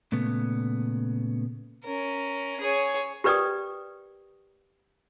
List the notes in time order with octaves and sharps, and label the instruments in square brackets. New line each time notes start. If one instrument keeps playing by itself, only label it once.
[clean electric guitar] A#2 C#3 A3 B3
[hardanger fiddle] C#4 A#4
G#4 C#5
[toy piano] G4 A#4 B4 D5 G5 D#6